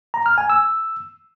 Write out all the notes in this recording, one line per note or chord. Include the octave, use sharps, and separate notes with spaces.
A#5
F6
G#5
E6